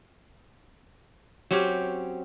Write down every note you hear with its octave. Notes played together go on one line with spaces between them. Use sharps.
F#3 C4 C#4 G4